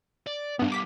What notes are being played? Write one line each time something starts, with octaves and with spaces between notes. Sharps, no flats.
D5
G2 B2 G3 B3
D6 B6